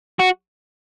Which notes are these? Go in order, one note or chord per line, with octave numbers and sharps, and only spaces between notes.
F#4